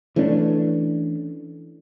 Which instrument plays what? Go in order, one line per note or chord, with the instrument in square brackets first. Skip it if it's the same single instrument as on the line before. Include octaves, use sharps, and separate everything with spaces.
[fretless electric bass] E3 A3 C#4 D4